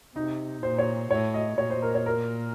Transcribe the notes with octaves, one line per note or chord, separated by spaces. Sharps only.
C3 D#4
A#2 C5
C#5
A2 C#5
D#5
A#2 C#5
C5
A#4
C#5
A#4